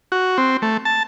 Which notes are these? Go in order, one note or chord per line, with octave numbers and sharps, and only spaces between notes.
F#4
C4
A3
A5